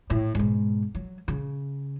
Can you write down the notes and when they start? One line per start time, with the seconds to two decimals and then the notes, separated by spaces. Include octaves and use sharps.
0.10 A2
0.35 G#2 B2
0.95 F#3
1.28 C#3